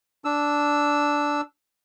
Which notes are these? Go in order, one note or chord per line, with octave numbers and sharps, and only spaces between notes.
D4 E6